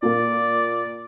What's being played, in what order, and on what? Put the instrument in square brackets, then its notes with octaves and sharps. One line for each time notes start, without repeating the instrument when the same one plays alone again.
[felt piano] A#2 A#3 [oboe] D5